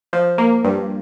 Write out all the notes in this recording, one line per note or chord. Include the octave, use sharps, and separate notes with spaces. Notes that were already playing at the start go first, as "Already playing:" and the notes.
F3
A#3
G2